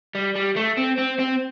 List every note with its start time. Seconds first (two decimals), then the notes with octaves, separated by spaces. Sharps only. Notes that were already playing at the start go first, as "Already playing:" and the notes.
0.15 G3
0.36 G3
0.57 A3
0.78 C4
0.99 C4
1.20 C4